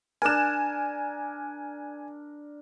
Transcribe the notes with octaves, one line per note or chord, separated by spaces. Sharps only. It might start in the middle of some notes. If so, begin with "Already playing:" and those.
D4 A#4 G#5 E7